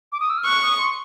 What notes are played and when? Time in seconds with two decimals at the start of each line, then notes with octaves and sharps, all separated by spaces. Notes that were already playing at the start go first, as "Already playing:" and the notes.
0.12 D6
0.20 D#6
0.30 E6
0.38 F6
0.45 C#6 F#6
0.62 D#6
0.79 C6